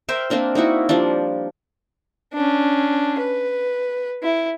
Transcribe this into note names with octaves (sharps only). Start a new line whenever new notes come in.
A#4 C5 E5 G5
A#3 C4 D4 A#4
A#3 D#4 E4 F#4
F3 G3 A#3 D4
C#4 D4
B4
E4